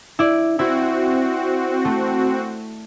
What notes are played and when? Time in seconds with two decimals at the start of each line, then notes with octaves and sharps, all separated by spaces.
0.19 E4 D5
0.59 C4 E4 F#4
1.85 A3